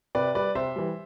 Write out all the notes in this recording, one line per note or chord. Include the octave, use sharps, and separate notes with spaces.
C3 B4 D5
G3 B4 D5
C3 C5 E5
E3 G3